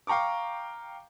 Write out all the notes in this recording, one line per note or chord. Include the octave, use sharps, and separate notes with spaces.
F5 G5 A#5 C#6 D6